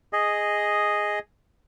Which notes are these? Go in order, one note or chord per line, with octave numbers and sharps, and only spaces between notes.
G#4 D#5